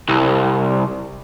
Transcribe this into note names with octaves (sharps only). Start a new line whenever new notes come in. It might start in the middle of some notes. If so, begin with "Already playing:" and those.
C2